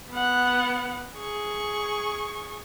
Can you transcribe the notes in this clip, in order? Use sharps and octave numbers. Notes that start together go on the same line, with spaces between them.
B3 F#5
G#4 C#6